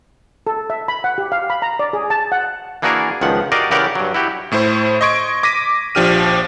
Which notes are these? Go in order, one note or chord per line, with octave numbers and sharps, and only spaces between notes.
A4
E5
B5
F#5
G4
F5
B5
A#5
D5
G#4
A5
F#5
E3 A#3 D4 F#4 G#4 A#4
C#2 D#3 F3 F#5
F#4 G4 A#4 D5 D#5 F5
C#3 E3 G4 A#4 D5 F#5
G2 F#3
E4 F#4 G4
A2 A3 E4 C5
D#5 C6 C#6 G#6 D7
D6 A#6 B6 D#7
A#1 F3 D4 G4 F6 D#7